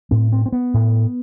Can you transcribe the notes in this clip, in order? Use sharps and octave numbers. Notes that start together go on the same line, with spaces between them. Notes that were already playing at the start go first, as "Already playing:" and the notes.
A2 C4
C4
C4
B3
A2